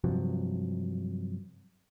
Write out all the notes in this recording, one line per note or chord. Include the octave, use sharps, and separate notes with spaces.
G2 C3 F3 F#3